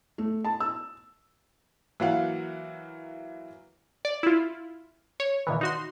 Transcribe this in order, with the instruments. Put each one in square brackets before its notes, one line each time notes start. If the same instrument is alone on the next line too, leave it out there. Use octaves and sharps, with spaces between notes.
[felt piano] A3
A5
E6
E3 F#3 A#3 F4 F5 F#5
[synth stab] D5
E4 F4
C#5
A#2 D#3 E3
D#4 F#4 C6